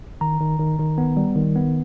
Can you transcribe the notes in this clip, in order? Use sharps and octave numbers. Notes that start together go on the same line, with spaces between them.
D#3 A#5
D#3
D#3
D#3
B3
G3
D#3
B3